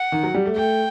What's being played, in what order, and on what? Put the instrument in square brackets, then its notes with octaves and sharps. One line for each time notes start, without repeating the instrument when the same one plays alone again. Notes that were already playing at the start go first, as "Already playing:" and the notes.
Already playing: [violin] F#5
[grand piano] D#3
F#3
G3
A3
[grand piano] A3 [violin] G5